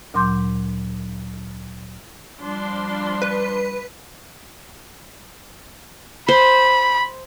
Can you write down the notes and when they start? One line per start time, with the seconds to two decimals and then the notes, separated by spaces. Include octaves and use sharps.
0.14 D2 A#2 F#3 C6 D6 G6
2.40 F3 G3 D4 C6
3.22 B4
6.28 C5 B5